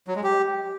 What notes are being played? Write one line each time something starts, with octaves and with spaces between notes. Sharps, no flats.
F#3
G#3
G4